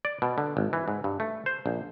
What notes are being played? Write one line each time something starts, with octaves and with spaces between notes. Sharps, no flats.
D5
B2
D3
G#1
E3
G#2
G2
A3
C5
A#1